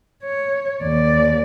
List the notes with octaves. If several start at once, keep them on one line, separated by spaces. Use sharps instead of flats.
C#5
D#2 D5